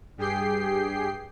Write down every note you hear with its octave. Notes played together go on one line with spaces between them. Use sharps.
G2 G4 G#4 G5 C7